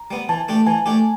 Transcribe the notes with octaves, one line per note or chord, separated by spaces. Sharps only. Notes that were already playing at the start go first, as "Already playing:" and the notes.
Already playing: A#5
G3 B3
E3 A5
A3 D4 G4
E3 G#5
A3 D4 G4